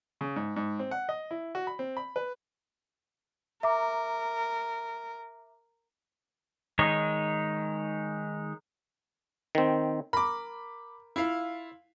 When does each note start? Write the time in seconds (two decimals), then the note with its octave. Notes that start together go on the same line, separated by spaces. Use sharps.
0.21 C#3
0.36 G#2
0.56 G#2
0.79 C4
0.91 F#5
1.09 D#5
1.31 E4
1.55 F#4
1.67 B5
1.79 C4
1.97 B5
2.16 B4
3.63 A#4 E5 A#5 D6
6.79 D#3 G#3 D#4 C#5
9.55 D#3 C4
10.13 A#4 B5 D6
11.16 E4 F4 F5